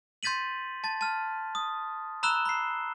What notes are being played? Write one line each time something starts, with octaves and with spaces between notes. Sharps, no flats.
C6 G6 A6 B6 D#7 F#7
A5 A6
A5 F6
D#6
A#5 B5 E6 F#6 E7 G7
B5 C7